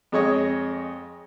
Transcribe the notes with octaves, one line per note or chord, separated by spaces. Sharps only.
F2 G#3 C#5 D#5